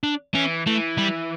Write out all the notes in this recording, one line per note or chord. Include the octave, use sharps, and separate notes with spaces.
D4
E3 C#4
E3 A3
G3